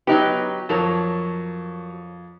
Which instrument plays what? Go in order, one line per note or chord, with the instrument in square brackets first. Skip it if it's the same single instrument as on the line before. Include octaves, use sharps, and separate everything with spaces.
[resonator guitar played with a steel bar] F#3 D#4 G4 [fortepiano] B3 F#6
[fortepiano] F2 A5 [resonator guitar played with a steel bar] F#3 A#4 C#5